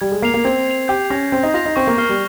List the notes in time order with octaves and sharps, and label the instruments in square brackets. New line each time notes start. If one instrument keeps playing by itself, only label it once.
[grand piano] G3 [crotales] G#6
[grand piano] G#3
[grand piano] A#3 [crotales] C7 F7
[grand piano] A#3
[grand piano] C4 [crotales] G#6
[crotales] C7 F7
[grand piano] G4 [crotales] G6
[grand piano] C#4 [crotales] A#6 F7
[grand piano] C4 [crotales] G6
[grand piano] D#4
[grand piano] F4 [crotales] A#6 F7
[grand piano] D#4
[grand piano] C4 [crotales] C#6
[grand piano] A#3
[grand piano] A#3 [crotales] F6 C7 G7
[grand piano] G3